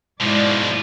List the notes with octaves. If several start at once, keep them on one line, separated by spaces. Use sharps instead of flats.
G#2 B2 F3 E4 D5